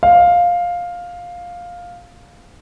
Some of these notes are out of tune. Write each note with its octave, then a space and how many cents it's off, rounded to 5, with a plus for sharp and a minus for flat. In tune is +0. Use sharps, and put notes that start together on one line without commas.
F5 +10